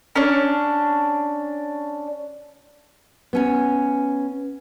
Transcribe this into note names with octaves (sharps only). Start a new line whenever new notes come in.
C#4 D4
B3 C#4 G#5